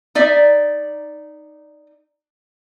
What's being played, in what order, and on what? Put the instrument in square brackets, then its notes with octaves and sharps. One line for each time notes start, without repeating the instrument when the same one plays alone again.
[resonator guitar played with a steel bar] D#4 D5 E5